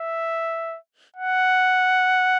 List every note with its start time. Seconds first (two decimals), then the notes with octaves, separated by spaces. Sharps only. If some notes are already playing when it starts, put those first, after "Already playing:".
Already playing: E5
1.16 F#5